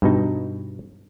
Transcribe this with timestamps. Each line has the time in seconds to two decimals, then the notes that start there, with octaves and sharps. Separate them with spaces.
0.02 G2 B2 D#4